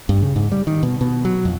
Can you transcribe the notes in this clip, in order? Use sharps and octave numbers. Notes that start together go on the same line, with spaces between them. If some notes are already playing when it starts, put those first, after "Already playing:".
G2
C#3
G#2
G3
D#3
B2
B2
F#3
F2